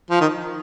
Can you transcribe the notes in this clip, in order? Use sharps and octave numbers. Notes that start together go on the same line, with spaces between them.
F3
D#3